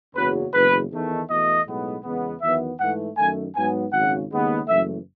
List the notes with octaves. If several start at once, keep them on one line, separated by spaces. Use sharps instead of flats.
F#1 E2 C#3 F#3 B4
F#1 E2 C#3 B4
E2 D#3 A3
E2 B2 A3 D#5
B1 A2 G#3 B3
E2 C#3 G#3 B3
E2 D#3 F#3 B3 E5
G#2 E3 A3 F#5
F#2 D#3 A3 G#5
G#2 F#3 B3 G#5
G#1 F#2 C#3 F#5
D#2 C#3 G#3 B3
F#1 F#2 E3 A3 E5